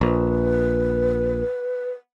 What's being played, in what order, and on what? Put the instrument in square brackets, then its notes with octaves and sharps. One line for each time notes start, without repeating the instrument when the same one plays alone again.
[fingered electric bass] A#1 [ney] B4